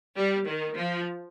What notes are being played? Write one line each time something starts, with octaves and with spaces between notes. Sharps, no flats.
G3
D#3
F3